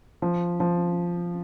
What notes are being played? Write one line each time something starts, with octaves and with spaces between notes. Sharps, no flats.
F3
F3